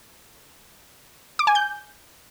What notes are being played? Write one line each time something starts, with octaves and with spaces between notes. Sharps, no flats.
D6
G#5
G6